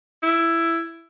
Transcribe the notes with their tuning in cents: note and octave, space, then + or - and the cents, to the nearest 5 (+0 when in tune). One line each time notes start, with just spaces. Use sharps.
E4 +10